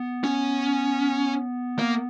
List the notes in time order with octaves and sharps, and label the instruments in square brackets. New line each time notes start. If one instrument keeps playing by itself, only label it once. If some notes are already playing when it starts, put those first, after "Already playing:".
Already playing: [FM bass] B3
[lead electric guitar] C#4
A#3